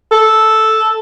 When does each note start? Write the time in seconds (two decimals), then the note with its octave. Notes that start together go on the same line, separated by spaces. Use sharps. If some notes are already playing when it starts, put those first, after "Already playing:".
0.12 A4